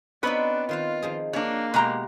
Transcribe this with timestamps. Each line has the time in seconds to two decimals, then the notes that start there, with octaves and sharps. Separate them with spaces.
0.23 B3 C4 D4 D#4 F4 B4 C#5
0.69 D#3 F4 C5 F5
1.02 D#3 F3 G#4
1.33 A#3 D4 C#5
1.74 B2 G#3 E4 G4 G5 A#5